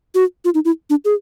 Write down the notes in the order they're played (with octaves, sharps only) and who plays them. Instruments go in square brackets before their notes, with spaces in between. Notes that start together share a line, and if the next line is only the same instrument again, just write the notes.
[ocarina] F#4
F4
D#4
E4
D4
G#4